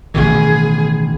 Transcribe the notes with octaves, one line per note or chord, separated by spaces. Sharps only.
A1 B2 D#3 G#4